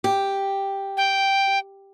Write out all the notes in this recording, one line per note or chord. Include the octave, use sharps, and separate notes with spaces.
G4
G5